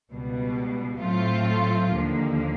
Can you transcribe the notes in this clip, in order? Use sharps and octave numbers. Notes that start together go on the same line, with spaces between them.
C#2 B2 G3
A2 F#3 A3 C4 F4
D#2 D3 F3 A#3